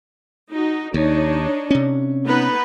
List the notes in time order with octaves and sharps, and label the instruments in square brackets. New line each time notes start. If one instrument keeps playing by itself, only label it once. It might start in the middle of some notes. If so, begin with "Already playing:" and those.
[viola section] D#4 F#4
[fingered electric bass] D#2 [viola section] D4 D#4 C#5
[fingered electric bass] C3 C#4
[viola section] B3 D#4 B4